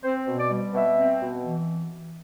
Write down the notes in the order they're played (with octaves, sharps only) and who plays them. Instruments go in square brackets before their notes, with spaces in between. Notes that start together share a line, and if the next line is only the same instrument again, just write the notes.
[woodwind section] C4 C5
B2
D5
G3
B2 E5
C4
B2
E3